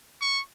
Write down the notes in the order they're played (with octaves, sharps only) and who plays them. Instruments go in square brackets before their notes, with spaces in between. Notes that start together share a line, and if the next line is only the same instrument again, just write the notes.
[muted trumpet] C#6